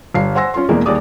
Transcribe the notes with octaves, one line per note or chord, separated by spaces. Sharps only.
G1 G3 F5 C7
C5 F#5 G#5 C6 E6 A#6
C#4 F4 C6
E2 B2 E3 G#3 A#3 D4
D#2 G3 G#4 D5 D6 D#6